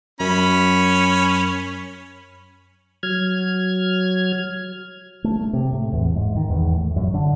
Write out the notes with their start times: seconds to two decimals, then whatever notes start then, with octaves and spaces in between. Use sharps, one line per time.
0.20 F#2 C#4 B5
3.03 F#3 F6 G#6
5.24 A3
5.53 C3
5.73 A2
5.93 E2
6.16 G#2
6.36 D#3
6.50 E2
6.74 A2
6.96 F#2
7.14 D3